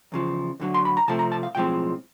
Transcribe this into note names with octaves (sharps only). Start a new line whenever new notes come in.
E2 C#3 F3
D2 D3 F#3
C6
B5
A#5
C3 F3 A3 A5
A#5
A5
F5
B1 A2 F3 G#3 C4 G5